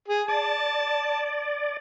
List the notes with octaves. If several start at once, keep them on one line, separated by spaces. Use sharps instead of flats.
G#4
D5 A5